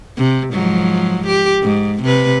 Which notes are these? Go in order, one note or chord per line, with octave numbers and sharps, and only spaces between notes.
C3
G#2 F3 F#3
G4
G#2
C3 B4